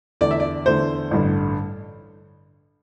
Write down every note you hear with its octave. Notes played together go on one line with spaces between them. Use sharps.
E2 D3 A3 D5
E5
D5
E2 D3 A3 C5
A1 G2 D3